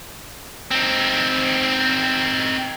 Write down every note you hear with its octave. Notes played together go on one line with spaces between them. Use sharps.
C4 D#4